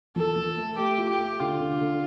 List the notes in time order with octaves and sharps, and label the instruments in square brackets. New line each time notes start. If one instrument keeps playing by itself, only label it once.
[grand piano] F3 [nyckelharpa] A4
[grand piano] F3
A3
[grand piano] A3 [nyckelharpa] G4
[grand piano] F4
[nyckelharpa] G4
[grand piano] A3
[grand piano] D3 [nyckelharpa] F4
[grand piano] D3
D3